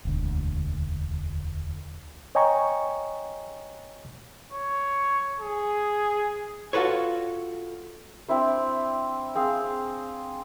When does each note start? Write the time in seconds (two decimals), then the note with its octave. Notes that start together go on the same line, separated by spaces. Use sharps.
0.05 E1 D2
2.35 C#5 D#5 G5 G#5 A#5 C#6
4.53 C#5
5.40 G#4
6.73 F4 F#4 A4 B4 C#5
8.29 C4 D4 E4 C5
9.35 C4 G#4 F5